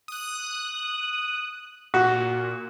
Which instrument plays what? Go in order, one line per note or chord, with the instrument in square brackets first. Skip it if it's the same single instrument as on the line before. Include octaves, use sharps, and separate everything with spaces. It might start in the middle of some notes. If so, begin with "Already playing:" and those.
[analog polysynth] D#6 F#6
[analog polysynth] A#2 [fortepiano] F#4